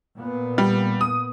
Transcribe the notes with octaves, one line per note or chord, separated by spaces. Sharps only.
A#2 B3
G3
D#6